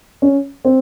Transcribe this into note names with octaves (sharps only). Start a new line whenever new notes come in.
C#4
C4